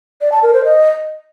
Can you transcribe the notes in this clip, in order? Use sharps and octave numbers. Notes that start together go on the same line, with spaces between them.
D5
A5
A#4
C5
D#5